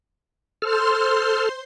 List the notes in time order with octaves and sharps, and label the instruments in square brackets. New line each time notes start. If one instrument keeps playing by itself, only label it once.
[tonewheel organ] A4 F6 [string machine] C5 C6